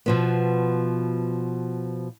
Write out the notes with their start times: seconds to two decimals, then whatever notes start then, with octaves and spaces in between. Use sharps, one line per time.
0.06 B2 F3 B3